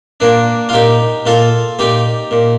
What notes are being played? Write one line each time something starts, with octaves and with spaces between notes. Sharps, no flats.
A#2 A#3 D4
F4
A#2 D#4 G4
A#2 F4 A4
A#2 D#4 G4
A#2